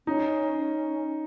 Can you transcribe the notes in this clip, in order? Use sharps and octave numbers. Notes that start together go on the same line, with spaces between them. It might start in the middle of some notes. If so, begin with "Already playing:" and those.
C#4 D#4
C#4